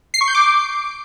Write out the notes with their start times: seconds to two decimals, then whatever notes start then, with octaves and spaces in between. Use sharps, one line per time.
0.14 C7
0.21 C#6
0.28 G6
0.35 D6